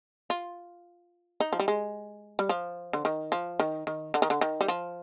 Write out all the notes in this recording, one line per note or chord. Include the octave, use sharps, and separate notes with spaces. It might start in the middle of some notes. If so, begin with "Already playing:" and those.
F4
D#4
F3
G3
G#3
G3
F3
D3
D#3
F3
D#3
D#3
D3
D#3
D3
D#3
G3
F3